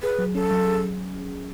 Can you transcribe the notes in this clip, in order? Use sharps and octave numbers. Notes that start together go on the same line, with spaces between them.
G#4 B4
F#3
C#4 A4
F#3
G#4